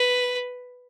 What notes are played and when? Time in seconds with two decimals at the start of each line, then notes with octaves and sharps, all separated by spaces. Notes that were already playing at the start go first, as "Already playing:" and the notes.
Already playing: B4